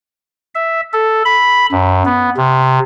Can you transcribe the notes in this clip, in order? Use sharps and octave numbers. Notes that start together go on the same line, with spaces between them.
E5
A4
B5
F#2
B3
C3